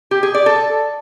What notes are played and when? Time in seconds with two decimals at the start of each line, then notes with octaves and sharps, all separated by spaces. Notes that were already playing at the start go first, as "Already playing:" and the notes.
0.11 G4
0.23 G#4
0.34 D5
0.46 A4